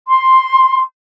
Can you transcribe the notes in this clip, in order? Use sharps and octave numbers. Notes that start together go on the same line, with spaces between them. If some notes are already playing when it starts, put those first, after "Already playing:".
C6